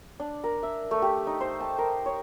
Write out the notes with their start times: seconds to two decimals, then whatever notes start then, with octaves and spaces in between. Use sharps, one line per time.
0.20 D4
0.44 A#4
0.63 E5
0.91 A3
1.02 G4
1.27 D#4
1.41 C5
1.60 A5
1.78 A#4
2.06 C#5